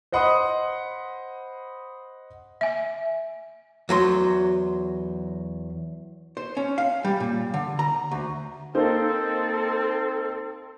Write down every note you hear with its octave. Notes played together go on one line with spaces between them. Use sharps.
C5 D#5 F#5 B5 C6 D#6
E5 G#5
E2 F#3 C6
C5
C#4
F5
G3
A#2
D3
A#5
D2
A#3 C4 D#4 A4 C5